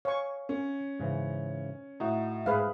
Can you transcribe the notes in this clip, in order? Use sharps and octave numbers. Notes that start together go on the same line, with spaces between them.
C#5 F5 G#5 C#6
C#4
G#2 C#3 E3
A2 D#4 F#4
G#2 G#4 B4 F5